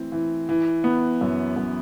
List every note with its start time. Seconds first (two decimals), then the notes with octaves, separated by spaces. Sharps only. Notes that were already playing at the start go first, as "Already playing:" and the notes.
Already playing: E3 A3 C4
0.12 E3
0.49 E3
0.84 B3
1.21 F#2
1.57 F#2